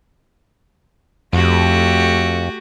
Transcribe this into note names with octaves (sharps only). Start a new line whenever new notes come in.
F2 A3 F#4 G4